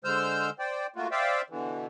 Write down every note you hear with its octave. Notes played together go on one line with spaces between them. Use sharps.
D3 G#3 C5 E6 F6 G6
C5 D5 G5
A3 A#3 F4 F#4
C5 D5 E5 F5 G5
B2 D3 E3